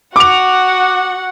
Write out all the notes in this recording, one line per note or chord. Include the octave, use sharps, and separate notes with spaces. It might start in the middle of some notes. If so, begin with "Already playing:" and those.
F#4 F#5 D6 F7